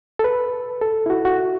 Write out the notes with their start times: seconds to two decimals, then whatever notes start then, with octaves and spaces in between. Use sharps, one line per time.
0.19 A4
0.24 B4
0.82 A4
1.06 E4
1.10 F#4
1.25 F#4